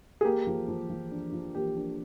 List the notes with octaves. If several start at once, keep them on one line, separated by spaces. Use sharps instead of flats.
G#4
A#3 G4
F3
F3
F3
D4
F3
A#3 G4
D4